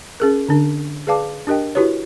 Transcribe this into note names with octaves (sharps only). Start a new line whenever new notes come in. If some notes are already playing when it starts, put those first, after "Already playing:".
C#4 G#4 A#4
D3 D4
G#4 B4 D5 F5 A5 D6
D4 G4 A#4 D#5 G5
E4 F#4 G4 B4 C#5